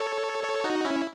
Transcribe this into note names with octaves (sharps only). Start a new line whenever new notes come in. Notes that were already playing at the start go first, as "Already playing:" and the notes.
Already playing: A4 C#5
A4 C#5
D#4 F#4
C#4 E4